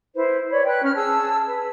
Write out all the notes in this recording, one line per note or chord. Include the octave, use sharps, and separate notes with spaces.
E4 B4 C5
B4 C#5 D5 B5
B4 G5 F#6
C#4 F6
G#4 A5 E6
B4